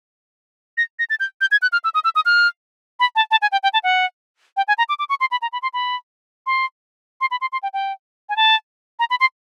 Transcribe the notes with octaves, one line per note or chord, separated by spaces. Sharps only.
A#6
A#6
A6
G6
G6
G#6
F#6
F6
E6
D#6
E6
D#6
F6
B5
A5
A5
G#5
G5
G5
A5
F#5
G5
G#5
A#5
D6
D6
C#6
C6
B5
A#5
B5
C6
B5
C6
C6
B5
C6
C6
G5
G5
G#5
A5
A#5
B5
C6